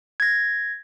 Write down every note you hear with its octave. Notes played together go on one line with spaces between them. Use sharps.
G#6 A#6